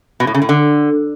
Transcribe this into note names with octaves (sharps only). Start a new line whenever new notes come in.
B2
A2
C#3
A2
D3